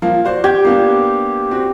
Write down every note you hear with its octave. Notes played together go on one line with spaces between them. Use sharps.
F3 A#3
F#4 C5 D5
G4 G6 G#6
A#3 B3 D4
C4 F#4